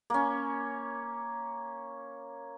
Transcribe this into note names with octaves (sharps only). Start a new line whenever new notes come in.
A#3 C#4